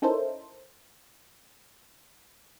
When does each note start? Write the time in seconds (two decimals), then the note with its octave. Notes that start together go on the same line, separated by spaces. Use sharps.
0.02 C#4 D#4 E4 A4 A#4 C5